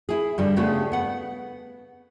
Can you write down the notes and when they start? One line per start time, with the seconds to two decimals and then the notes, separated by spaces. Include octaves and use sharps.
0.09 E4 G#4
0.38 G2 D3 G3
0.56 C#3 A3 B3 D4 G4 G#4
0.92 B3 F#5